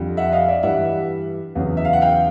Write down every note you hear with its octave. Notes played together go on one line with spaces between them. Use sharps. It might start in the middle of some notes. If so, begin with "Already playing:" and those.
Already playing: F2 D3 G3
E5 F#5
D#5 F5
D5 E5
G2 E3 G3 E5 F#5
E2 C#3 F#3
E5
F5
F#5
F5 G5